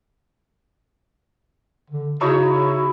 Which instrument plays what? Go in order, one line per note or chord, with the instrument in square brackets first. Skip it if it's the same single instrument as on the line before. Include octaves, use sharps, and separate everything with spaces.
[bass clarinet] D3
[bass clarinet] C#3 [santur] D#4 E4 C#5 [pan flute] F#4